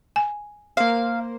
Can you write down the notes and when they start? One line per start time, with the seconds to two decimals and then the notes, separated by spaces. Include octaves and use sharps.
0.16 G#5
0.77 A#3 C5 F5